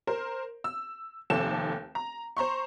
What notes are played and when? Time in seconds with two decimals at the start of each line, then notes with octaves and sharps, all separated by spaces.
0.07 A#4 C5
0.64 E6
1.30 F1 D#2 C4 A4 E7
1.95 A#5
2.37 C5 A#5 C6 C#6